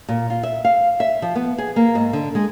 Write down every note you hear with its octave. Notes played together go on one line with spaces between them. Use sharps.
A#2
F4
E5
F5
E5
F3
B3
G#4
A#3
G#2
D3
G#3